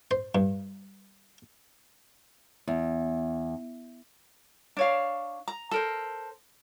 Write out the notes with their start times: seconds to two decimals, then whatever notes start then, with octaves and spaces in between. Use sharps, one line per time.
0.11 C5
0.35 G2
2.67 E2
4.77 D4 C#5 F5
5.48 A#5
5.71 A4 A#4 C5